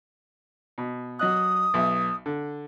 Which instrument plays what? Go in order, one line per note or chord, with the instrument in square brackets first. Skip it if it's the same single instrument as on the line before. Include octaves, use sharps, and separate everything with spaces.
[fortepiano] B2
[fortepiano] F#3 D#5 F#6 [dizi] D#6
[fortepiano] B1 E5
D3